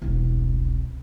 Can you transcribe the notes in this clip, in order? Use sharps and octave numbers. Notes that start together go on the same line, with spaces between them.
E1 C2